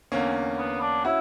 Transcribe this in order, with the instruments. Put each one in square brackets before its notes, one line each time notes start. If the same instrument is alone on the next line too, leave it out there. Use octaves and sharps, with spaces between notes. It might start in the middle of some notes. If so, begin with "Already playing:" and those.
[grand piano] E2 D3 A#3 C#4
[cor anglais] B3
D4
[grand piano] C#4 F#4 [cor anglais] E4